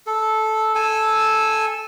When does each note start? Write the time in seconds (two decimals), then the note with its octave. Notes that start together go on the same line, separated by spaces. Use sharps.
0.07 A4
0.75 A4 G#5 E6